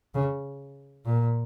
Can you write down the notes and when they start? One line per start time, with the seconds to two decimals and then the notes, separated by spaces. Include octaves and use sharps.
0.15 C#3
1.05 A#2